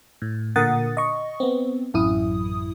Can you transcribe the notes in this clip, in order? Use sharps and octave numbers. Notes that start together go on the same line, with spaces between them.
A2
A#2 D3 A#4 F#5 D#6 A6
D#5 C#6
B3 C4
A1 F#2 E4 D#6